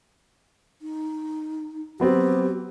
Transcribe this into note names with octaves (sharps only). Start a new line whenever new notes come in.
D#4
F#3 B3 C4 G4